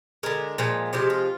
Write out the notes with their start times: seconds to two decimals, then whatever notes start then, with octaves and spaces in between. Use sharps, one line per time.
0.23 D3 G#3 A#4
0.58 A#2 F3 G#3
0.93 C3 F3 G#3 G4
1.10 F4